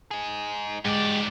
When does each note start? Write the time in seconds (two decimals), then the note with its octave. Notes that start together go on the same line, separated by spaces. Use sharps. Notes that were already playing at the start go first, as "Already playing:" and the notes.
0.11 D#4 G#4
0.85 G#2 G#3 F#4 G4 D5